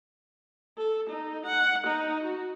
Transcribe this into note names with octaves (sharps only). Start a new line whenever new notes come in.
A4
D#4
F#5
D#4
F#4